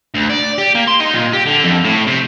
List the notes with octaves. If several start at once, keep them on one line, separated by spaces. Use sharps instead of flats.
D2
D5
G4
A#3
C6
D#4
A#2
G4
D3
F2
A2
C3